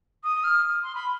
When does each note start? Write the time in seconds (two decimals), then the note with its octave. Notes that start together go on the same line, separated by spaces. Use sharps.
0.23 D#6
0.43 F6
0.83 C6
0.94 B5